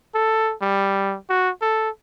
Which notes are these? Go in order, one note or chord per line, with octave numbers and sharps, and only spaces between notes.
A4
G3
F#4
A4